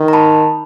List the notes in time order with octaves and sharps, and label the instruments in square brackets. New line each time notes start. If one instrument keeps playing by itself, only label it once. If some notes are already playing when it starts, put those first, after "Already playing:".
Already playing: [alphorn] D#3
[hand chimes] A#5
A5 B5